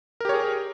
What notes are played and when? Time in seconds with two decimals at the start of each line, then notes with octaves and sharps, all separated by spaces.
0.20 A#4
0.25 G4
0.29 C#5
0.34 G#4